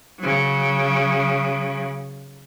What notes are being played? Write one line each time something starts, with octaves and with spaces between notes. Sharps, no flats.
C#3 F#3